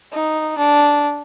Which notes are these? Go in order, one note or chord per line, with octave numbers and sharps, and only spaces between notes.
D#4
D4